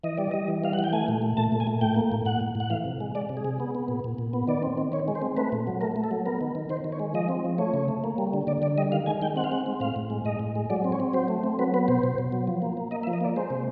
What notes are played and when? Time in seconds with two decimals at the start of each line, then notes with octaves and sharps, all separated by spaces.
0.04 E3 D#5
0.17 G3 D5
0.31 G3 D#5
0.48 E3
0.64 G3 F5
0.73 F#5
0.79 E3
0.84 G5
0.93 A3 G#5
1.08 A#2
1.22 A3
1.37 A#2 A5
1.52 A#2
1.60 G#5
1.67 A3
1.81 A2 G5
1.96 A#3
2.12 A2
2.26 A2 F#5
2.41 A2
2.55 A2
2.60 F#5
2.70 E3 F5
2.85 C3
3.00 G#3
3.15 G#3 D5
3.29 C3
3.37 G#4
3.45 C3
3.60 B3
3.75 B3
3.88 A#2
4.04 A#2
4.18 A#2
4.33 B3
4.48 D#3 D5
4.63 C4
4.78 D#3
4.92 D#3 C#5
5.08 G#3
5.15 C5
5.22 C4
5.37 A3 B4
5.52 A#2
5.67 F#3
5.81 A3 A#4
5.96 A3
6.04 A4
6.11 F#3
6.26 B3 A#4
6.41 D#3
6.55 D#3
6.70 D#3 C5
6.84 D#3
6.92 C#5
7.00 G#3
7.14 F3 D#5
7.29 C4
7.44 F3
7.58 A3 C#5
7.74 C#3
7.88 A3
8.04 A#3
8.18 G3
8.34 D3
8.47 D3 D5
8.62 D3 D5
8.78 G3 D#5
8.92 D#3 F5
9.06 G#3 G#5
9.22 D#3 G5
9.36 C4 F#5
9.44 F5
9.52 G#3 F#5
9.66 C4
9.80 A2 F5
9.96 A2
10.10 G#3
10.25 A2 D#5
10.39 A2
10.55 G#3
10.70 F#3 D5
10.84 C4
10.92 C#5
11.00 C4
11.13 F#3 C5
11.28 A3
11.44 C4
11.59 F#3 B4
11.74 B3 B4
11.88 B2 C5
12.03 B2
12.18 B2
12.32 F#3
12.47 F3
12.62 A#3
12.77 A#3
12.91 A#3 D#5
13.03 E5
13.07 F3
13.13 D#5
13.21 A#3 D5
13.36 G#3 C5
13.50 C3